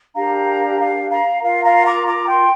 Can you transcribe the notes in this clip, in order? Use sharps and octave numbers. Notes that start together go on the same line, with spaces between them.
D4 G4 A#4 F5 A#5
F5
F5 A#5
F4 A#4 F5
F5 A#5
A#5 D6
A#5 D6
G5 C6